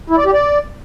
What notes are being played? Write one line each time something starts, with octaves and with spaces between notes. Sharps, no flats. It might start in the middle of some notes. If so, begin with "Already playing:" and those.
E4
D5
G4
D5